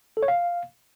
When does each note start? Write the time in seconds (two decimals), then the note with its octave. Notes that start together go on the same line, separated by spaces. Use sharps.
0.17 A4
0.23 C#5
0.28 F5